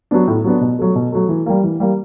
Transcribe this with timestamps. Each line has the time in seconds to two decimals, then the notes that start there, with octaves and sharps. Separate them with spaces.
0.11 F#3 B3 D4
0.28 A2
0.44 F#3 B3 D4
0.61 B2
0.79 F#3 A3
0.95 B2
1.12 F#3 A3
1.29 E3
1.46 G3 A#3
1.64 E3
1.80 G3 A#3